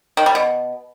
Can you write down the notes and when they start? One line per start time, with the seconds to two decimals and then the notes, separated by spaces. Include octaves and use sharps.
0.17 D#3
0.26 G3
0.35 B2